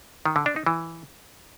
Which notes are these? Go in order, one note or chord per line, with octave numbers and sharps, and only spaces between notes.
D#3
D3
D4
D#4
E3